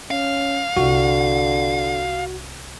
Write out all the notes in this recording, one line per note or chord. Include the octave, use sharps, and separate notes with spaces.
C#4 F5
C2 D3 F4 F#4